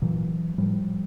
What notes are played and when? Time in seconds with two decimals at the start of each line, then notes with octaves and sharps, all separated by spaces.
0.02 A#2 E3 F#3
0.58 A2 F3 G3